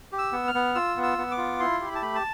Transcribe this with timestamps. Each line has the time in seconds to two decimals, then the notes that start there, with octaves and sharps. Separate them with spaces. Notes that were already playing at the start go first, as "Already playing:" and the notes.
0.13 G4
0.18 E6
0.32 B3
0.48 F6
0.54 B3
0.75 F4 E6
0.97 B3
1.03 E6
1.18 B3
1.31 D6
1.38 F4
1.60 E4 C6
1.80 G4
1.87 B5
1.95 A5
2.02 A3 B5
2.15 A5